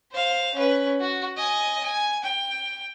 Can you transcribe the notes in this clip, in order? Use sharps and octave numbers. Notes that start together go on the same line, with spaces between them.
C5 F5
C#4 B4
F#4
D#5 G#5
G#5
G5